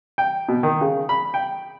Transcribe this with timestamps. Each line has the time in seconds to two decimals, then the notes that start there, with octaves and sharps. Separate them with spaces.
0.18 G5
0.49 B2
0.63 D#3
0.81 C#3
1.09 B5
1.34 G5